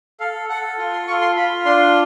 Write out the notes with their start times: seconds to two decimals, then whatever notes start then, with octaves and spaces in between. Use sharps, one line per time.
0.20 A4 F5
0.49 A4 F#5
0.78 F4
0.93 C6
1.07 F4 C#6
1.21 C6
1.36 F4 B5
1.65 D4 C6